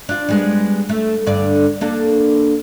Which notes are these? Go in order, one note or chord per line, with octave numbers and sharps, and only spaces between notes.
D4 F4
G3 G#3 B3
A3
G2 D3 D5
A#3 D4 A4